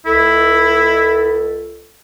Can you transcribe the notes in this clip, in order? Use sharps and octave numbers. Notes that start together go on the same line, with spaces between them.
C#2 E4 A4